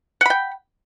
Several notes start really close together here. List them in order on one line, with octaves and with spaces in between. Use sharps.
F#5 B5 G5